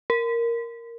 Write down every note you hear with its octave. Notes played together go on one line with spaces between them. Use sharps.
A#4